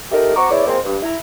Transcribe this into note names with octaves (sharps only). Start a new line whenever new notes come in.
A3 D#4 G4 A#4
C4 F#4 A#5 C#6 D6
E2 E4 C#5 D5
F3 G#3 A#3 C4
G2
E4 A#5